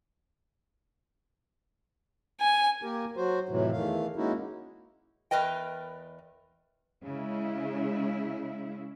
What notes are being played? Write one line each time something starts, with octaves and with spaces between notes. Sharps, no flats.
G#5
A#3 G4 A#4
F#3 F#4 C5
F2 A2 C3 E3 F#3
E2 D#3 E3 A3 F5
G#3 A#3 C#4 D#4 E4 F#4
E2 A#4 B4 D#5 G5
C#3 G#3 E4